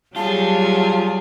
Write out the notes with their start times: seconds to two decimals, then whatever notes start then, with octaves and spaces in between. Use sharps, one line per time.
0.16 F#3 G3 F4 G4 G#4 A5